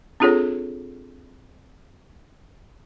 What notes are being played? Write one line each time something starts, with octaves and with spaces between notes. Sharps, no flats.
C4 D4 F4 G#4 A4 C#5